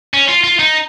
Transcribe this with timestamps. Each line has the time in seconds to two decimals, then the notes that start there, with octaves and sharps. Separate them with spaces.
0.14 C#4
0.28 F4
0.44 F4
0.59 D#4